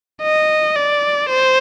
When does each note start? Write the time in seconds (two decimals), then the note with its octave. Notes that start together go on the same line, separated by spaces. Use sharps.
0.22 D#5
0.76 D5
1.29 C5